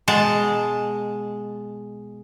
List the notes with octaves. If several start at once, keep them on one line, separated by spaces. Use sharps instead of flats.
B2 G#3 A5